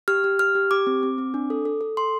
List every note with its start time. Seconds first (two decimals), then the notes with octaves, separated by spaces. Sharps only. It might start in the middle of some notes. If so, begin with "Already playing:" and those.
0.08 G4 F6
0.24 G4
0.39 G4 F6
0.55 G4
0.71 G4 D6
0.87 C4
1.03 C4
1.18 C4
1.34 D4
1.50 A4
1.65 A4
1.81 A4
1.97 A4 C6